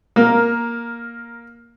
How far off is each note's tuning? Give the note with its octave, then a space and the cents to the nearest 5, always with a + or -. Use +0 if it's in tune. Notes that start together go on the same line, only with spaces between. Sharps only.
A#3 +10 A#4 +0